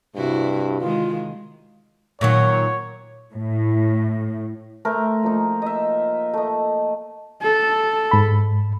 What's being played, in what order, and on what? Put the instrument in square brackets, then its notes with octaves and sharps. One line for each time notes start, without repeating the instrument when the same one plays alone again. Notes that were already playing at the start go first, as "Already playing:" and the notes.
[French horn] G2 [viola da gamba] C3 E4 F#4
[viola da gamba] D#3 G#3 [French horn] F4
[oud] A#2 D#3 F#3 [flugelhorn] C#5
[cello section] A2
[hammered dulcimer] A3 [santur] A#4 C5
[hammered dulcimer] F3 A#3 D#4
[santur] D#5 E5
A3 D#5
[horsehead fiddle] A4
[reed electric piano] G#2 B5